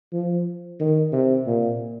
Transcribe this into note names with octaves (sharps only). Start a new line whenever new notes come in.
F3
D#3
C3
A#2